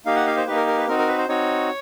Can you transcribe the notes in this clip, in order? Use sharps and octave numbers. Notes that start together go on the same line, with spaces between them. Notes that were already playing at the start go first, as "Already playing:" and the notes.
A#3 D#4 G4 F5
F#5
F5
C5
A#3 D#4 G4 B4
A#4
A#4
B4
C4 D#4 F#4 A#4
A#4
B4
C5
C4 D#4 F#4 C#5